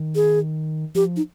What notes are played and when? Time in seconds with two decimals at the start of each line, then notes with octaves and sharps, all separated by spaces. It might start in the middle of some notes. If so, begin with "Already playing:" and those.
Already playing: D#3
0.15 G#4
0.95 F3 G4
1.16 D#4